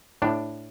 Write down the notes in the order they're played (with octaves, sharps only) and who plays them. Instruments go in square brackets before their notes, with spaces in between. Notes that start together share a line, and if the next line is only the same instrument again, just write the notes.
[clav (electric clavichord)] A2 D4